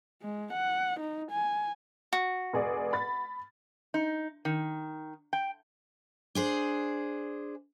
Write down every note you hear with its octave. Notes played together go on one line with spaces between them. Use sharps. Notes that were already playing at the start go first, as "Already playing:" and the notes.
G#3
F#5
D#4
G#5
F#4
F1 G#4 D5
B5 A6
D#4
D#3
G5
D4 G#4 C5